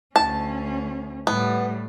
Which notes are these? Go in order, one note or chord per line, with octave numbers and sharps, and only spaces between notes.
D2 C#4 A5
A2 G3 B3